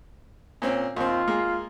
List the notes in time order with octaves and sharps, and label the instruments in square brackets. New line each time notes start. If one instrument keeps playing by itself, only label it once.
[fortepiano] A#2 C4 C#4
[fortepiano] D#2 C4 [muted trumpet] F4
[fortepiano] G#3 A#3